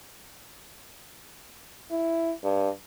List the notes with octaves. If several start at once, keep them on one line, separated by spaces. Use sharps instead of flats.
E4
G2